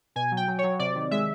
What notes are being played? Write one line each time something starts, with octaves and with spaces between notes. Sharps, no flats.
B2 G#5
F#3
G5
F#3
C#5
F#3
C3 D5
D#3
G#3 E5